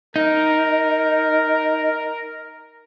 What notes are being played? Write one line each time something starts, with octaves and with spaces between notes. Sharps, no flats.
D#4 A#4